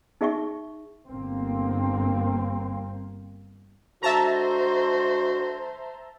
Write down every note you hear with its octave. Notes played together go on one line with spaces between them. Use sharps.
D#4 G#4 E5 G5 C#6
G1 A#3 C4
D3 G#3 F#4 C5 E5 A5 A#5